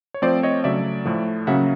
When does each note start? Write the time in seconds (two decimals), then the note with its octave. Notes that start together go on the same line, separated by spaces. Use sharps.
0.14 C#5
0.22 F3 A3 C4 C5 D5
0.43 C#5 D#5
0.64 C#3 F#3 A3 D5 E5
1.05 A2 F3 A3
1.47 C#3 F#3 A#3 C#4 E5 F#5